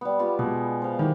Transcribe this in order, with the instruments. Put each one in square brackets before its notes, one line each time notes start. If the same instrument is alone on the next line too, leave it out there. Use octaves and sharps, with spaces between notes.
[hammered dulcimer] G3 B3
B3 F4 G4
[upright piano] B2 [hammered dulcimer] G#3
[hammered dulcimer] C5 F5 F#5
[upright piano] D#3 [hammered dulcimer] E4 G4